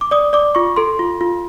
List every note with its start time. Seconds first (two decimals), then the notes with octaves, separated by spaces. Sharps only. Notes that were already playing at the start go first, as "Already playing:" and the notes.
0.01 D6
0.11 D5 D#6
0.33 D5 D6
0.55 F4 C#6
0.76 A4 C6
0.99 F4
1.21 F4